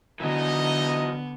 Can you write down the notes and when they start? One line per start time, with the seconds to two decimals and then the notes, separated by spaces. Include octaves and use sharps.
0.20 D3 E3 F#3 B3 D#4 D#5